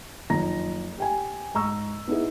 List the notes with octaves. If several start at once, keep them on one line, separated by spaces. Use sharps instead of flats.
F#1 D#3 F3 A#5 A#6
G4 G5 G#5
G#2 A#5 C#6 E6
B3 D#4 E4 G#4